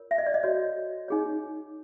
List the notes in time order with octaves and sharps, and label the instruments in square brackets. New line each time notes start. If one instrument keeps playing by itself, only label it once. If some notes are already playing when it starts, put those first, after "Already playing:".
Already playing: [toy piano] F4 A#4 C#5
E5
D#5
D5
D#5
F#4 A4 C#5
D#4 G#4 C#5